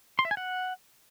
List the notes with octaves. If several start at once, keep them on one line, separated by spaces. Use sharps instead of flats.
C6
E5
G#5
F#5